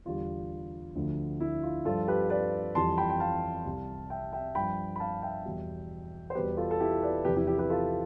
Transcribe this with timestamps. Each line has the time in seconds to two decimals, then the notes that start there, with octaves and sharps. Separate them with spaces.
0.06 E2 D3 G3 F4
0.95 D2 D3 F3
1.40 E4
1.63 F4
1.85 G2 F3 F4 A4
2.08 G4 B4
2.30 B4 D5
2.75 F2 E3 G3 A5 C6
2.98 G5 B5
3.10 G5
3.20 F5 A5
3.65 C2 C3 G3
4.10 E5 G5
4.33 E5 G5
4.55 G2 F3 G5 B5
4.96 B5
5.00 F5 A5
5.22 E5 G5
5.45 E2 B2 G3
6.30 C5
6.35 E2 B2 G3 G4 B4
6.57 F4 A4
6.71 A4
6.80 E4 G4
7.03 B4 D5
7.24 E2 C3 F3 G4 B4
7.36 E4 G4
7.47 E4 G4
7.59 G4 B4
7.70 F4 A4